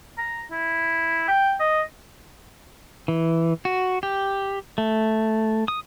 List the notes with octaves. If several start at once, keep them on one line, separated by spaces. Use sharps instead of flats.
A#5
E4
G5
D#5
E3
F#4
G4
A3
D#6